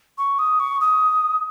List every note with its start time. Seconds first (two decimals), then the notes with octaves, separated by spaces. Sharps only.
0.18 C#6
0.39 D#6
0.60 C#6
0.81 D#6